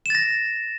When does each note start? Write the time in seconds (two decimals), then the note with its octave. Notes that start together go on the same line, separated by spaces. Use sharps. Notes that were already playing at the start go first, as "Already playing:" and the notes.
0.06 E7
0.10 A6
0.15 A#6